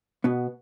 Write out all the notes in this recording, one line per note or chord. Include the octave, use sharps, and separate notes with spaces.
B2 B3